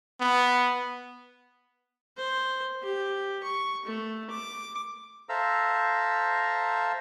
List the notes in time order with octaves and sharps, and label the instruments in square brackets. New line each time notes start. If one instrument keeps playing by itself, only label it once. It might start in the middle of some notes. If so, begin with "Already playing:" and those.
[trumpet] B3
[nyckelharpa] C5
G4
C#6
A3
D6
[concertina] A4 C5 E5 F5 A#5 E6